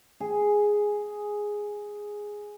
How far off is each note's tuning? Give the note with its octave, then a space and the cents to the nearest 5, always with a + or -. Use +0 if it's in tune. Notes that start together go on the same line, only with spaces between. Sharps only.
G#4 +0